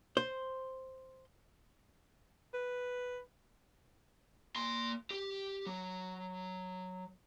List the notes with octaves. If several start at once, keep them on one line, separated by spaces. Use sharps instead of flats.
C5
B4
A#3 C6
G4
F#3